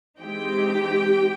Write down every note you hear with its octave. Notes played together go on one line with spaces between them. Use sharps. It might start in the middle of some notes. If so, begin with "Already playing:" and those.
E3 G#3 C4 D#4 G4 G5